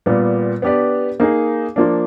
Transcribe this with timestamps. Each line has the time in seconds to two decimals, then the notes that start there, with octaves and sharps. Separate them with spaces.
0.06 A#2 G3 B3
0.62 B3 D4 G4 B4 D5
1.20 A#3 D#4 G#4
1.76 F3 A#3 D4